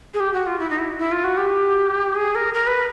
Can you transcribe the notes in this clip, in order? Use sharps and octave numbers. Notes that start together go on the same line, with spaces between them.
G#4
G4
F#4
F4
E4
D#4
E4
E4
F4
F#4
G4
G#4
A#4
A#4
B4